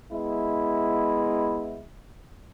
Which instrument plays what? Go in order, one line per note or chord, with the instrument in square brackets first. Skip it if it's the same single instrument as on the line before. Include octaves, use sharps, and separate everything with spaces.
[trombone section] G#3 B3 E4